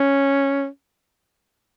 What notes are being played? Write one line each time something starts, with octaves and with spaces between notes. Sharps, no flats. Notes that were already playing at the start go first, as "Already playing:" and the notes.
Already playing: C#4